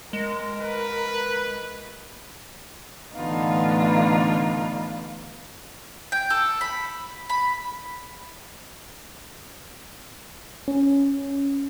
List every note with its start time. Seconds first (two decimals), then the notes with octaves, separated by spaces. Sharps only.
0.13 G#3 A#4
0.62 B4
3.15 A2 D3 E3 B3 D#4 F4
6.12 G5
6.30 A4
6.61 B5
7.29 B5
10.68 C#4